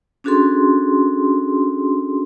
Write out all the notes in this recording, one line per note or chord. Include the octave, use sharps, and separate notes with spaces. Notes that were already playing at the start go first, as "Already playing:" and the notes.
C#4 D4 F#4 G#4 A4 C6